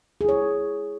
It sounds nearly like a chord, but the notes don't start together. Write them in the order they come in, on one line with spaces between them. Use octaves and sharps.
G#4 E4 C#5